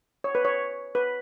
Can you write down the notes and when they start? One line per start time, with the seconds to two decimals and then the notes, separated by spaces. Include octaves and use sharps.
0.24 C#5
0.35 B4
0.45 C#5
0.95 B4